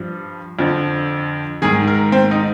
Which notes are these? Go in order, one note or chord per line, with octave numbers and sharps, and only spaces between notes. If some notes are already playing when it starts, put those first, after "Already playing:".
Already playing: G2 F3
F2 D3 F3
G#2 D#3 G#4
A#4
C4
D#4